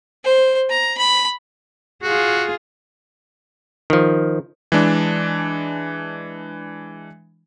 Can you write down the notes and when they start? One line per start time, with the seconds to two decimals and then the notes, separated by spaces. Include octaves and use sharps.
0.24 C5
0.70 A#5
0.98 B5
2.03 F4 F#4 G#4
3.90 D#3 F3
4.72 E3 G#3 D4